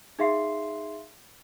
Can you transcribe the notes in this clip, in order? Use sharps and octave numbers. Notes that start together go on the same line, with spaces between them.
D#4 G#4 E5 F5 C6 C7